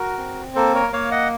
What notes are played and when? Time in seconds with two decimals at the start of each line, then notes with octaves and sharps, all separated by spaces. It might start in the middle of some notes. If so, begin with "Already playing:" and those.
Already playing: F#4 A#4
0.18 C4
0.56 A#3 A4 C5
0.75 A#4 C#5
0.93 A#3 C#5 F5
1.11 D#5 F#5